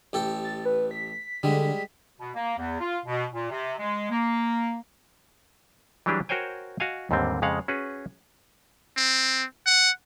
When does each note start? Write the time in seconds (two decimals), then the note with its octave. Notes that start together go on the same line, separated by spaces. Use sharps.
0.13 A1 G4 A4
0.44 A6
0.65 B4
0.91 B6
1.43 D3 G3 G#3
2.20 B2
2.35 A#3
2.58 E2
2.80 F4
3.06 B2
3.33 A#2
3.50 C3
3.78 G#3
4.10 A#3
6.06 E3 F#3 G3 D4 G4 G#4
6.29 F#4 A#4 C5 C#5 G5 G#5
6.80 F#4 D#5 F5 G#5
7.11 D#2 G#2 D3 G3 C4
7.42 F2 C#3 G#3 F5 F#5
7.68 C#4 F#4 G#4 B4
8.97 C4
9.66 F#5